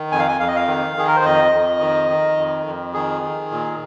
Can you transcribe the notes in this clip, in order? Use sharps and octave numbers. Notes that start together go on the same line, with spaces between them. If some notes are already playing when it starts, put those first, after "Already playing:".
Already playing: D#3
F2 G#5
F5
G#5
F2 F5
D#5
F5
D#3
D#3 G#4
A#4
C5
F2 D#5
F2
D#3
D#3
F2
F2
D#3 G#4
D#3
A#2